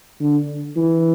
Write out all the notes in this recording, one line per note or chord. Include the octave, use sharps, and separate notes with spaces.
D3
E3